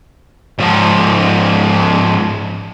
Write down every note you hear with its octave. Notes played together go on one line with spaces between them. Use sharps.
G#2 F3